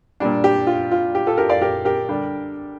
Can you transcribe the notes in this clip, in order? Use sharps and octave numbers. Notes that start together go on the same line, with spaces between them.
A#2 G3 D4
G4
F4
F4
G4
F4 A4
G4 A#4
D5 F5
G4 A#4
G4 A#4
D3 G3 D4